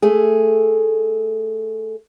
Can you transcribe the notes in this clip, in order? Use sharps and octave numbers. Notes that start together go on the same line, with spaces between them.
A3 G#4